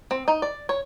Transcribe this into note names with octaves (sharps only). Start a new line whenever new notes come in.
C4
D#4
D5
C#5